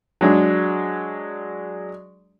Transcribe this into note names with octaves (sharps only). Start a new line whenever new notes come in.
F#3 G#3 D4